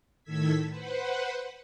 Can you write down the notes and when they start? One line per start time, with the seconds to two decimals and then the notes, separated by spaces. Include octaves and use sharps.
0.24 A2 D#3 A4 E6 G#6 B6
0.69 B4 C5 F#5